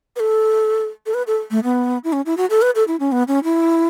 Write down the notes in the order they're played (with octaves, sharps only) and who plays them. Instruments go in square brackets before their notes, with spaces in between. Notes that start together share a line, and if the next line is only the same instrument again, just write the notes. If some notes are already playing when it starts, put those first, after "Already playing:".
[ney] B4
A4
A4
B4
A4
A3
B3
E4
C#4
E4
F#4
A4
B4
A4
E4
C#4
B3
C#4
E4